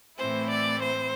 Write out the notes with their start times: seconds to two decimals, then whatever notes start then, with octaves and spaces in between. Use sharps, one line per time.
0.17 A2 E3 A3 C4 E4 C5
0.49 D5
0.82 C5